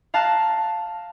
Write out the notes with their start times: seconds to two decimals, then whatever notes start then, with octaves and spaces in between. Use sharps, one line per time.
0.14 F5 A5 A#5 F#6 E7